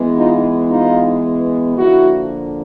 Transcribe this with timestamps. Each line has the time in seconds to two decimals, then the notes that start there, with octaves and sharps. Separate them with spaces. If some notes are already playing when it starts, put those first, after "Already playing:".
Already playing: E3 G#3 B3
0.15 D#4 F4
0.69 D#4 F4
1.77 D3 F3 A#3 E4 F#4